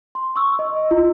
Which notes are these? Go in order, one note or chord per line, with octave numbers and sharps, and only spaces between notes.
C6
C#6 E6
D#5
E4 F4